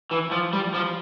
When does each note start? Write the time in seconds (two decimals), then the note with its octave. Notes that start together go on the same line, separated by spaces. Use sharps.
0.11 E3
0.32 F3
0.53 G3
0.74 F3